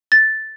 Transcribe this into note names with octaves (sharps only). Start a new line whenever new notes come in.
A6